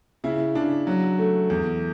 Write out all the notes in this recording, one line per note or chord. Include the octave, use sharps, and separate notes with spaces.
C#3 E4
C#3 D4
F#3
A3
E2